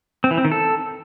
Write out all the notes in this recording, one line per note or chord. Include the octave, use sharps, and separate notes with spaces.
C4
E3
C4
D#3
A4